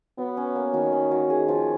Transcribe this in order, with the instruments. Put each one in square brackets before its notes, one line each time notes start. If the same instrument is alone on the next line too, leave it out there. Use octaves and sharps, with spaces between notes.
[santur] F#3 [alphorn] B3
[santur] C#4
A#3
[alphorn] D#3 [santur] F#3
[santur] C#4
F#3
[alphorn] D#3 [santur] G#4
[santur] F3